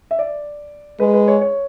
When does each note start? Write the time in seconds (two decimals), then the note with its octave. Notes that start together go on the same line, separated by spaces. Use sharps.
0.11 E5
0.19 D5
1.00 G#3 B4
1.14 B4
1.28 C#5
1.41 C#5